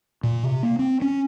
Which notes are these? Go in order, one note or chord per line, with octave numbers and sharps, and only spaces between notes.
A#2
C3
A#3
C4
C#4